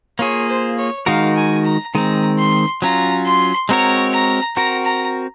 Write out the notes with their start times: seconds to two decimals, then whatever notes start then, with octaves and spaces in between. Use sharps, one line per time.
0.19 A#3 F4 G#4 C#5
0.49 C5
0.78 C#5
1.06 D#3 G#3 D#4 F#4 A#4 F5
1.36 G#5
1.65 A#5
1.94 D#3 G#3 C4 A#5
2.38 C6
2.82 F#3 C#4 F4 A#5
3.25 C6
3.69 G#3 C4 F#4 A#4 C#5 A#5
4.13 A#5
4.56 C4 F#4 A#4 A#5
4.85 A#5